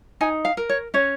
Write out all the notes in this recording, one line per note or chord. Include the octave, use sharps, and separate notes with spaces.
D#4 G#5
F5
A#4
C#5
C#4 C#5